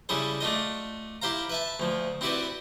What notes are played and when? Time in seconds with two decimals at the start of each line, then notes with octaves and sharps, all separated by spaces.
0.09 C#3 G3 E4 G#4 A4 C5
0.41 A3 D4 F4 D#5
1.22 E4 G4 C5 F5 A#5
1.50 B4 E5 A5
1.80 D2 F3
2.21 C4 E4 F#4 G4 B4 D5